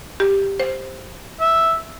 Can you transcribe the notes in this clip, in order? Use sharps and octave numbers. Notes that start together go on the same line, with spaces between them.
G4
C5
E5